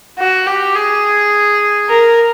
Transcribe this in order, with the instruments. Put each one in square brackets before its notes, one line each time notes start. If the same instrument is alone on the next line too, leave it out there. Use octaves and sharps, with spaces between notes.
[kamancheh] F#4
G4
G#4
A#4